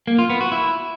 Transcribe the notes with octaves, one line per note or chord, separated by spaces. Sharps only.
A#3
F4
B3
F#4
E4